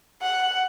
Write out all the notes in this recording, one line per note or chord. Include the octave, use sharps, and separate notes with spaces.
F#5